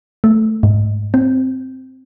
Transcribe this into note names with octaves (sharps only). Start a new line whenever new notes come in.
A3
G#2
C4